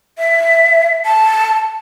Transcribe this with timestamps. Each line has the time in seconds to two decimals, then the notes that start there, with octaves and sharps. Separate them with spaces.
0.18 E5
1.05 A5